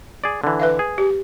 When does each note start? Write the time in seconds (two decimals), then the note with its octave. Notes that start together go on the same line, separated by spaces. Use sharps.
0.24 G#4 D5
0.44 D3 E3
0.59 B4 E5 F5
0.79 G#4
0.98 G4